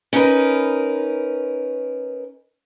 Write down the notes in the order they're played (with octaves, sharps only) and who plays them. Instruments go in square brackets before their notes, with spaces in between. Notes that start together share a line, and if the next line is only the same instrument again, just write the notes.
[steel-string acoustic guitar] C#4 D#4 A#4 B4